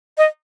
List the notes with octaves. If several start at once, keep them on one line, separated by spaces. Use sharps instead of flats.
D#5